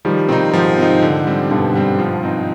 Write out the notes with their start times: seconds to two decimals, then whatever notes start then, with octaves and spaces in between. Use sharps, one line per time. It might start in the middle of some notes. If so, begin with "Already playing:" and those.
0.05 D#3 F3 G3
0.29 C3 D#3 C4 D#4
0.53 G#2 F3
0.78 C4 D#4
1.02 D3
1.27 G3 C4
1.50 G2 B2 D3
1.75 G3 C4
1.99 F3
2.23 C4 D#4